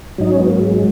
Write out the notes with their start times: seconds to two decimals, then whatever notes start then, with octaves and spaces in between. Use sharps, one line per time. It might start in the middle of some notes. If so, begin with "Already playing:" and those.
0.18 G#2 F#3 D#4
0.31 C#4
0.40 B3
0.50 A#3
0.59 G#3